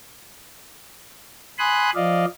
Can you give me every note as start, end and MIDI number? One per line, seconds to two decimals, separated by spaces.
1.58 1.90 80
1.58 1.90 83
1.58 1.90 84
1.58 1.90 87
1.58 1.90 90
1.95 2.25 53
1.95 2.25 74
1.95 2.25 75
1.95 2.25 77